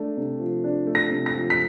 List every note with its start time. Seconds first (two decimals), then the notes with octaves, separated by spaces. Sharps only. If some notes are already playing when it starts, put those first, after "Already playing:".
Already playing: A3 D4
0.17 C3
0.40 F3
0.64 D4
0.87 A3
0.95 A#6
1.10 C3
1.26 A#6
1.34 F3
1.50 B6